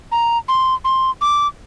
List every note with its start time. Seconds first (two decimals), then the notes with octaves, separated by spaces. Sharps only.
0.12 A#5
0.48 C6
0.85 C6
1.21 D6